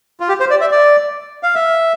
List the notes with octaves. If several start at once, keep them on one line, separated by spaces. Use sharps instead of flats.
F4
G4
C5
D5
E5
D5
F5
E5